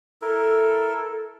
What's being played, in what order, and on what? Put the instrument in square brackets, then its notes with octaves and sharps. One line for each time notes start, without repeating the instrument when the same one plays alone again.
[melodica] E4 A#4 [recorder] A4